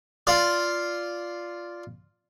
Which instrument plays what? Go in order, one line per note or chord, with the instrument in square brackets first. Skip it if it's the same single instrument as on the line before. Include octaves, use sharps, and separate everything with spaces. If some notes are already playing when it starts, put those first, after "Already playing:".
[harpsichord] F4 D5